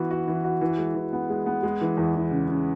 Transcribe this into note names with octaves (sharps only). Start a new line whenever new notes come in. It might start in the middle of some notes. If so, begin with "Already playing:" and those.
Already playing: E3 B3 F#4
F#4
E3
F#4
E3
G#3
E3
B3
G#3
B3
G#3
E3
E2
E3
C#3
C#3